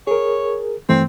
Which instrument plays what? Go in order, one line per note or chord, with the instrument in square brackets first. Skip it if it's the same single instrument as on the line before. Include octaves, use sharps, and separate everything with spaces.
[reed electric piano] G#4 A#4 [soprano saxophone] C#5
[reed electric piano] G2 E3 A3 [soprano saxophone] C4